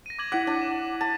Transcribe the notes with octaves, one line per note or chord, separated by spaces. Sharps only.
A#6 D#7
D6 G#6 F#7
E4 F#5 D6 B6
D4
E7
A5